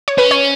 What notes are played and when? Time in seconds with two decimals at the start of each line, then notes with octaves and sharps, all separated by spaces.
0.08 C#5
0.18 C#4 B4
0.31 C#5